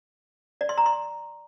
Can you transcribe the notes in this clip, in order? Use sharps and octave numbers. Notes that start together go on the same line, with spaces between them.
D5
C6
A#5
C6